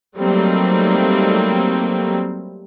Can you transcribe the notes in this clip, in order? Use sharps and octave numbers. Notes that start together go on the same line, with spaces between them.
F#3 G3 A3 A#3 C4 D#4